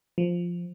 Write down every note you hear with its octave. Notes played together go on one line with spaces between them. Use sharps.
F3